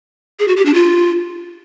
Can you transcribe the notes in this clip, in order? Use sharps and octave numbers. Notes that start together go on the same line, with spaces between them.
G#4
F#4
G4
D4
F4